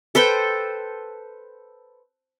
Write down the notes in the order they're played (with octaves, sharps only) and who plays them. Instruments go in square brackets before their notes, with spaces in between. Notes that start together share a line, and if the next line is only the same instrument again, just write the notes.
[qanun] A4 B4 C5 G5